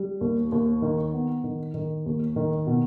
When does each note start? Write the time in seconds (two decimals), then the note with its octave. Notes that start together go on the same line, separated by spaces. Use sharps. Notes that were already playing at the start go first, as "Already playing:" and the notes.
Already playing: G3
0.21 D#2
0.52 D#2
0.82 D#3
1.13 B3
1.44 D#3
1.74 D#3
2.06 D#2
2.36 D#3
2.67 B2